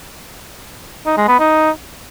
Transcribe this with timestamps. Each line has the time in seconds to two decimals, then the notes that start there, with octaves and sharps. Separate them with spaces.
1.06 D#4
1.17 G#3
1.28 B3
1.39 D#4